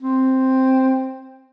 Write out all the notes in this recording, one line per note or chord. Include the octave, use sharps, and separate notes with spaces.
C4